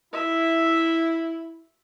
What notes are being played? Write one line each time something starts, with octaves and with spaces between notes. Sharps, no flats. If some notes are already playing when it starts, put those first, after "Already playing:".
E4 E5